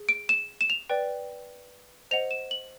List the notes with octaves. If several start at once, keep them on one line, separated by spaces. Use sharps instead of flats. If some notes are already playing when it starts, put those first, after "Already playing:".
Already playing: G#4
D7
E7
E7
F7
B4 D5 G5
C5 D#5 F#5 F7
E7
F#7